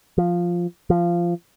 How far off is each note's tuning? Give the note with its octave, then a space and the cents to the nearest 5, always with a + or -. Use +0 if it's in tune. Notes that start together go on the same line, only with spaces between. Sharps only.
F3 +0
F3 -15